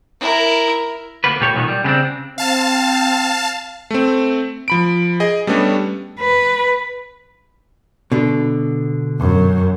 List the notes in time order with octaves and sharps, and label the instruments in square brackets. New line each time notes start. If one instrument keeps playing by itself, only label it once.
[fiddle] E4 A#4
[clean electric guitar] D2 A#3 B3 B4
A#2 A#3 G4 A4 C#5
B1 A#2 D#3 B3
G3
C#3 B3 C4 D4
[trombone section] C4 [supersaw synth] F5 A5
[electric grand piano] A3 C4
F3 B5 D7
G#4 D#5
G3 A3 B3 C#4 D4
[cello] B4
[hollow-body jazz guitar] B2 D3
[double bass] F#2